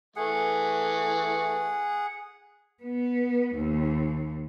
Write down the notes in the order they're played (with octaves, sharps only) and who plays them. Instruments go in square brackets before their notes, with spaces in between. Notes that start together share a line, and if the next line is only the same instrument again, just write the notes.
[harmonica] E3 A3 [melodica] G#4 F#5
[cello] B3
D#2